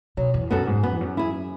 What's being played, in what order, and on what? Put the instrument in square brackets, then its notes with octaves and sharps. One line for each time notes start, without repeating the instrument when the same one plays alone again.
[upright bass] B2 [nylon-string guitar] F#3
[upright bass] E2
[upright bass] F#2 [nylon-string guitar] B3 F#4 A4
[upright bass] G#2
[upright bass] F#2 [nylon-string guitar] B3
[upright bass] E2
F#2
[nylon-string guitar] E4 G#4